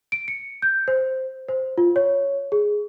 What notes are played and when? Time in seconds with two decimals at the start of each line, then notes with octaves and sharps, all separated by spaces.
0.12 D7
0.28 C#7
0.62 G6
0.88 C5
1.49 C5
1.78 F4
1.96 C#5
2.52 G#4